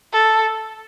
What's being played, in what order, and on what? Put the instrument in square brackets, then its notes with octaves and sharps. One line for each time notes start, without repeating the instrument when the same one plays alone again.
[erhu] A4